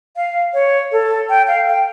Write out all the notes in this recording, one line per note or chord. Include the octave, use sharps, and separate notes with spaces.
F5
C#5
A4
G5
F5
G5